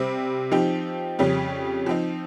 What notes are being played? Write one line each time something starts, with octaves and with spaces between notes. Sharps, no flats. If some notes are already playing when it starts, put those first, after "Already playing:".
Already playing: C3 G3 C4
F3 C4 D#4 G4
F2 C#3 G3 C#4
F3 C4 D#4